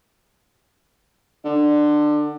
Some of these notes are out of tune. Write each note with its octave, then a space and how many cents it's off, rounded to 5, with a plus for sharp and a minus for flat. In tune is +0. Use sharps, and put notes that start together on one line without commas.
D3 +20